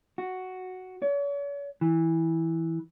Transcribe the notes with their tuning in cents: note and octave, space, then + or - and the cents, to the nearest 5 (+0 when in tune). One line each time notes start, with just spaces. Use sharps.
F#4 +0
C#5 +40
E3 -10